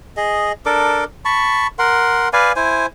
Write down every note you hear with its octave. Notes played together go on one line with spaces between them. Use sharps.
G#4 D#5
D4 A4 A#4 D6
A5 B5 C#6
A#4 F#5 C6
B4 D5 F5 G#5
E4 C5 G#5